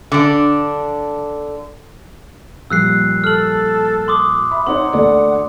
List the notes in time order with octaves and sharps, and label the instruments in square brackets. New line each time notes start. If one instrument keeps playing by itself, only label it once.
[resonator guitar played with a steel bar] D3 D4
[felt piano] A#2 F3 G3 [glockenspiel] E6 F#6 C7
[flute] A4 [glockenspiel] F6 F#7
[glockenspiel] C6 D6 D#6
[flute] E5 [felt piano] B5
[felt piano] C4 D#4 C#5 [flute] F#5 [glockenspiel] C6
[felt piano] D2 A4 D5